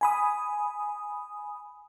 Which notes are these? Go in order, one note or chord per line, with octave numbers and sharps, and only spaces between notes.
G#5 B5 D#6